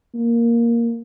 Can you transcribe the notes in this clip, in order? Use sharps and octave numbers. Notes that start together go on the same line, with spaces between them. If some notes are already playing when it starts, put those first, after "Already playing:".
A#3